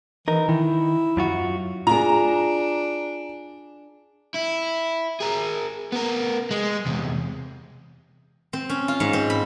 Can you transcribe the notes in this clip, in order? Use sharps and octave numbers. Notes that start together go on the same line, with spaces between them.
E3 D#4 A#4
D#3 E4
F#2 F4 F#4
D4 F4 G#4 A#5
E4
G#4 A#4
B3 A#4
G#3
E2 C3
C4
C#4
F4
G#2
C4
B5